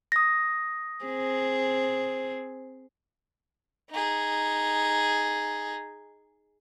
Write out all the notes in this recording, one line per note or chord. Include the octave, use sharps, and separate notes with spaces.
D#6 A#6
C4 G#4
D#4 G#4